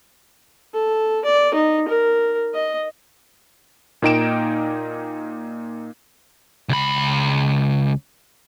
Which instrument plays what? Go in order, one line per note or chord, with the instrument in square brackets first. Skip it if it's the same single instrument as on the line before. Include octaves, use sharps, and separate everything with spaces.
[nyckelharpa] A4
D5
D#4
A#4
D#5
[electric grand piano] A#2 A#3 D#4 G5 D7 E7
[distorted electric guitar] C#2 B5